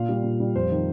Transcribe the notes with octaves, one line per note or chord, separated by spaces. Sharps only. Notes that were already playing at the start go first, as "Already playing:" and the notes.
Already playing: A#2 F5
G3
A#2
G3
F2 C5
D#3